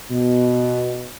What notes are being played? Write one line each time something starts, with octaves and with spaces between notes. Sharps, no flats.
B2